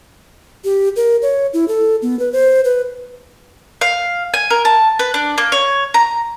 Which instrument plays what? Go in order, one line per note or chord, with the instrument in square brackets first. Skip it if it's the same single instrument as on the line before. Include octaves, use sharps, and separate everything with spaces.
[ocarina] G4
A#4
C#5
E4
A4
B3
B4
C5
B4
[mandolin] F5
G#5
A#4
A5
B4
D4
A#3
C#5
A#5